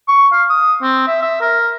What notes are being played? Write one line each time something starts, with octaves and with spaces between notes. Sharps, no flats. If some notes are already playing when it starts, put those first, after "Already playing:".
C#6
F5
D#6
C4
E5
E5
A#4